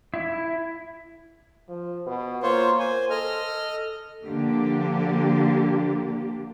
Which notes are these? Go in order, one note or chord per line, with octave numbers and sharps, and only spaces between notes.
E4
F3
B2
A#3 F4 C5 C#5
C5 G#5
A4 D#5 F6
D3 F3 A#3 D4 G4